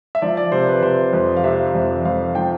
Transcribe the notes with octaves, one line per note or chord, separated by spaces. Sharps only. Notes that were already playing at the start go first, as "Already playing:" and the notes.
E5
F3 D5
D5
C3 C5
B4
C3 C5
F2
F5
C3 E5
F2
F2 F5
F3 G5